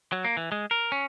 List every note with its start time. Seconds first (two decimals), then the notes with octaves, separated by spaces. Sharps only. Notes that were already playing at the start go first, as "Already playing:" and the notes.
0.12 F#3
0.25 A#3
0.37 E3
0.52 G#3
0.71 A#4
0.92 C#4